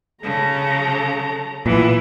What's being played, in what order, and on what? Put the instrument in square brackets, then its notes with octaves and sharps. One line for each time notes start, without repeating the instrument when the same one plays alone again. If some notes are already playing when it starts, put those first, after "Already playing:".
[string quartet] C#3 [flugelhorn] A4 [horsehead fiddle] A5 A#5
[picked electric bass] A#2 [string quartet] E3 [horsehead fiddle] B3 F4 [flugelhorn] B4